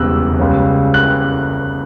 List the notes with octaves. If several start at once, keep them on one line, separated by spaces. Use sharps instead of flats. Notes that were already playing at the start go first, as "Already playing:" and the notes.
Already playing: E1 E2 C#3 G3 E6 F#6
C#2 C#3 G3 C#4
F#6